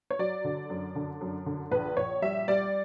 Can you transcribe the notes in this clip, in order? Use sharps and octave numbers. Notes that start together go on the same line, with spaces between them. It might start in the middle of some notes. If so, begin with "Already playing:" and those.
C#5
F#3 D5
D3
F#2
D3
F#2
D3
A#1 B4
A#1 C#5
G3 E5
G3 D5